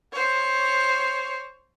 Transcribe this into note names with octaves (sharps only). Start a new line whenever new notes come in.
C5 C#5